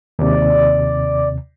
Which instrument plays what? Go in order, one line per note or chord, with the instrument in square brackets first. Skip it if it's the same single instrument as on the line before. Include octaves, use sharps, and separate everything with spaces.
[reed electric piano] D#2 C3 [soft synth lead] D5